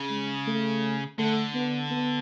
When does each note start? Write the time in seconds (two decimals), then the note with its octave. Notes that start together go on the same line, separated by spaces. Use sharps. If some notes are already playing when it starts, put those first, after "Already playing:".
Already playing: C#3
0.10 G#3
0.47 A3
1.18 D3 A3
1.54 B3
1.90 B3